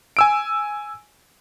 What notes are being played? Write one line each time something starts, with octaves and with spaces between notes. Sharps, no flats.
G#5 E6 D7